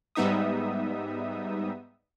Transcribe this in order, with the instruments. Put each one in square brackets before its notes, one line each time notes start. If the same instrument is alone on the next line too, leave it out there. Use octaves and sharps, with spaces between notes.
[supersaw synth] G#2 G3 B3 D#4 E5 D#6